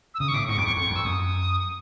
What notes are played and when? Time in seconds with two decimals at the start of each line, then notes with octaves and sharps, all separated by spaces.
0.14 E6
0.20 C#3 D#6
0.28 C#6
0.34 A2 D6
0.48 G#2 C#6
0.57 F2 D6
0.66 E2 C#6
0.76 F2 C#6
0.90 F2
0.96 E6
1.05 F#2 D#6